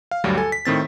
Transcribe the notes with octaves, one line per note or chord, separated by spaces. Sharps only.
F5
D2 G2 F#3 G3
A4 G#5
B6
A2 D#3 C4 A6